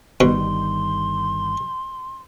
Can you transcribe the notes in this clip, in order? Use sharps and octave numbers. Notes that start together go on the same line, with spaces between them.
G1 B2 D#3 G3 C6